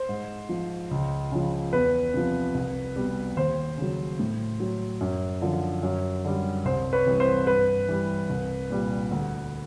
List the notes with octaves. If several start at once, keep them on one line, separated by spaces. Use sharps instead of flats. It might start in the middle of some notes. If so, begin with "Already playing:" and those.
Already playing: C5
G#2
F3
C#2
C#3 F3
E2 B4
C3 F3
C2
B2 G3
D#2 C5
C#3 F#3
A2
F#3
F#2
D3 F3
F#2
D3 G3
C2 C5
B4 C#5
C3 E3 G3
C5
G2 B4
E3 G3
C2
A#2 G3
D2